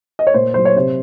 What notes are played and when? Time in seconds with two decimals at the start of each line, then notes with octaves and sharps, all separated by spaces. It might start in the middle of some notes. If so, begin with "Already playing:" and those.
0.19 D#5
0.27 C#5
0.34 A#2 C5
0.54 F#3 C5
0.65 C#5
0.76 C3 C5